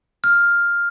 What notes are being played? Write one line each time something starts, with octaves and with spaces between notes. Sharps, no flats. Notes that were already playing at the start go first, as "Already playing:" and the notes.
F6